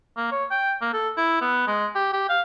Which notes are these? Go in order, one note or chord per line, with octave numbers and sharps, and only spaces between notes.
A#3
C#5
G5
A#3
A4
E4
B3
G#3
G4
G4
F5